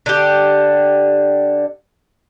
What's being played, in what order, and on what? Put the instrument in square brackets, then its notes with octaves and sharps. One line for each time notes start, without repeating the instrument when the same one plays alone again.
[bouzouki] D3 D4 G4